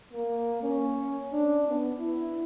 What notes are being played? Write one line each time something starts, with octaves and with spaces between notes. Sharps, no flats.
A#3
C#4
D4
B3
E4